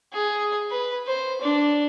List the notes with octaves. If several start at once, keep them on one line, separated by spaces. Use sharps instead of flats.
G#4
B4
C5
D4